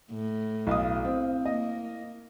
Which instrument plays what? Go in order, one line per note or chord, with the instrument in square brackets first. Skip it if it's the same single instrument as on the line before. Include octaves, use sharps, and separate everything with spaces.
[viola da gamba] A2
[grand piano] B1 D#6 [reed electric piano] E4 F5
[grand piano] C4
[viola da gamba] A#3 [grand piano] D#5